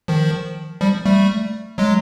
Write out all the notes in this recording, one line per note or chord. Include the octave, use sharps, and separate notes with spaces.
D#3 F3
F3 G3
G3 A3
F#3 G#3